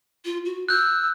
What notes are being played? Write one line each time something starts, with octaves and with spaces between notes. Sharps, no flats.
F4
F#4
E6 F#6 G6